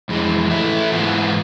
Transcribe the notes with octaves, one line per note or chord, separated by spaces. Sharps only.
F2 E3 G#3
E3 A3 E4
G#2 E3 B3 F4